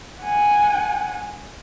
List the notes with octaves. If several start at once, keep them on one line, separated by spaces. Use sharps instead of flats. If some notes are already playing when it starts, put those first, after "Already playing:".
F#5 G#5